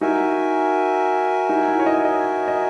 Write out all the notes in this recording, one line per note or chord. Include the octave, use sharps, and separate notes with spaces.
D#4 F#4 A#4 E5 G#5
D#4
E4
C#5
D#5
D#5
D#5